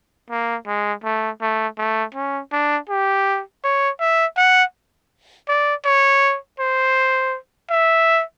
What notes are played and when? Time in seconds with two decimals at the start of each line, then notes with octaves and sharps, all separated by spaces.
0.30 A#3
0.67 G#3
1.04 A3
1.41 A3
1.78 A3
2.15 C#4
2.52 D4
2.89 G4
3.64 C#5
4.00 E5
4.37 F#5
5.49 D5
5.85 C#5
6.60 C5
7.71 E5